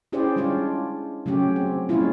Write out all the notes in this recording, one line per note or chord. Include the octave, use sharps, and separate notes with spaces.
C#4 E4 G4 G#4 C5 D5
G3 G#3 C#4 D4 F4
C#3 F#3 A3 C#4 G4
C4
G3 G#3 A#3 C#4 E4 F4